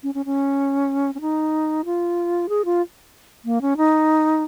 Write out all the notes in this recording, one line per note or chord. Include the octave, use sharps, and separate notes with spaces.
C#4
C#4
C#4
C#4
D#4
F4
G#4
F4
A#3
C#4
D#4